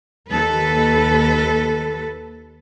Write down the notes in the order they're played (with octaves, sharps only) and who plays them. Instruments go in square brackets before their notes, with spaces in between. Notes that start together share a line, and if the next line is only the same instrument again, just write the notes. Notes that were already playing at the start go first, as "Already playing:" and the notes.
[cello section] D#2 A4 B4